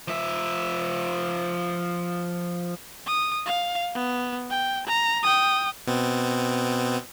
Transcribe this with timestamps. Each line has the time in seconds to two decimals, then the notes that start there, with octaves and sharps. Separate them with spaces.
0.08 F3 E5
3.06 D#6
3.46 F5
3.95 B3
4.50 G5
4.87 A#5
5.23 G5 D#6
5.87 B2 B3 C4